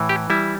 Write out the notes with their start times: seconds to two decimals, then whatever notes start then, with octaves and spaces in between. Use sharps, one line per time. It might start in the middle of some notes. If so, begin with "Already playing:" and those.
Already playing: A2 E3
0.09 G4
0.30 G3 E4